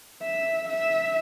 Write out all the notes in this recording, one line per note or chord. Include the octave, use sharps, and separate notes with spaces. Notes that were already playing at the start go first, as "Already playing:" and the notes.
E5
E5